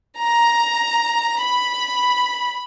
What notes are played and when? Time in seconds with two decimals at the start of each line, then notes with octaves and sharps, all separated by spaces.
0.21 A#5
1.43 B5